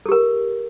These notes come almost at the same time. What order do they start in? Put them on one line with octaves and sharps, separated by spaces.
A4 G4 A#4